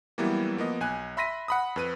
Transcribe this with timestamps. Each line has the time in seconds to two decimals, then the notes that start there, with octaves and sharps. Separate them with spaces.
0.18 E3 F#3 G3 A#3 B3 E4
0.57 F3 A#3 B3 D#5
0.80 B1 G#5 F#6
1.17 E5 B5 C6 A#6 B6 D#7
1.48 F#5 B5 D#6
1.76 F2 B4 D#7